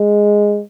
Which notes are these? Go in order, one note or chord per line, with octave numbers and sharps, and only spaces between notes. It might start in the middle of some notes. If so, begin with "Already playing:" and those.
Already playing: G#3